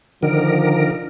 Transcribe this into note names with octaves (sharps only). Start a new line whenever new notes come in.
D3 D#3 F3 A#4